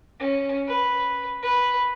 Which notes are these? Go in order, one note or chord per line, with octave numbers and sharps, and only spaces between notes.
C#4
B4
B4